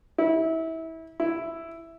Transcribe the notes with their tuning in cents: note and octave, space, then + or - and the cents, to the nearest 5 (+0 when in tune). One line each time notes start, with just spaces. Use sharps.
E4 -25
E4 +5